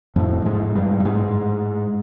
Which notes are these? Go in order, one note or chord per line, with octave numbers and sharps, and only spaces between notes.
F2 A2 F3
G#2 G#3
G2 G3
G3
G#2 G#3